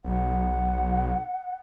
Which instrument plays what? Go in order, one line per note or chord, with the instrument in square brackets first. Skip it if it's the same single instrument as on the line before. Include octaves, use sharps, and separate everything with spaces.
[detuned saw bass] B1 [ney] F#5